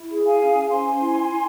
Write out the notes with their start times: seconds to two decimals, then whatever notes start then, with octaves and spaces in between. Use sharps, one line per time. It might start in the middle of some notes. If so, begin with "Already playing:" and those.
Already playing: E4
0.11 G#4
0.26 F5 G#5
0.41 C#4
0.70 C5 G#5 C6
1.00 E4
1.30 E4